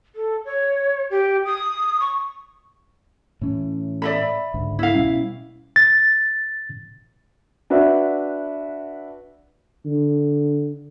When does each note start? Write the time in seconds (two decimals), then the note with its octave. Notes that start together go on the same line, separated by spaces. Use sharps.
0.15 A4
0.45 C#5
1.10 G4
1.45 D#6
2.00 C#6
3.41 A2 E3 C#4
4.02 D5 E5 B5
4.54 C#2 G#2 D3
4.79 E4 F5
4.94 B2 G3 C#4
5.76 A6
7.70 D4 F#4 B4 E5
9.86 D3